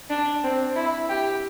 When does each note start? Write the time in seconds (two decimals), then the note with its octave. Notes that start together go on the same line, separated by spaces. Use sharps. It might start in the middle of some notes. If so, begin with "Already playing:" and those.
0.10 D4
0.44 C4
0.76 E4
1.09 G4